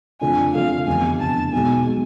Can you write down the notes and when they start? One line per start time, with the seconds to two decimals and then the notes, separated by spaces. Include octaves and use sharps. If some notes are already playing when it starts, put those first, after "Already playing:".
0.21 F2 D3 A3 D4 F4 G#5
0.55 F2 D3 A3 D4 F4 F5
0.87 F1 E2 D3 G#5
1.20 F1 E2 D3 A5
1.53 B1 B2 G#3 G#5
1.86 B2 G#3